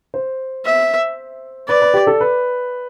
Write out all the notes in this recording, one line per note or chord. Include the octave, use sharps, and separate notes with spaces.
C5
E5
B4 D5
B4
G4
A4
B4